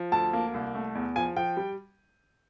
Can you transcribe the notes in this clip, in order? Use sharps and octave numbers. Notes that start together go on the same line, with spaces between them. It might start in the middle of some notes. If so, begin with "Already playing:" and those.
Already playing: F3
D2 A5
A#3
C2
A3
E2
F3 G#5
F3 G5
G3